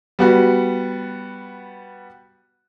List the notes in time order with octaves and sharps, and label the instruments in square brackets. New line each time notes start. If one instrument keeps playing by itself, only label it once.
[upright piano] G3 B3 F#4